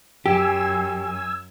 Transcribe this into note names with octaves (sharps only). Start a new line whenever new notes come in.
F#2 G4 G#5 E6